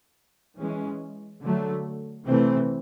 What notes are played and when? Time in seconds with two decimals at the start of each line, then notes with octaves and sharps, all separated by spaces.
0.58 E3 G#3 C#4
1.41 D3 F#3 A3
2.26 C3 E3 A3 C4